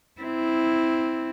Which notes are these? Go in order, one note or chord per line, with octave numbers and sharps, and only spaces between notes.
C4 E4